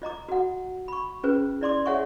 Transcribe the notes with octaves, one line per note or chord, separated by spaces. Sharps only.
F4 D#5 A#5 D6
F#4 F#5
B5 C#6
C#4 F4 G#4 B4 C5
E4 D5 C6 D6
G#4 C#5 E5 F#5 G#5 C#6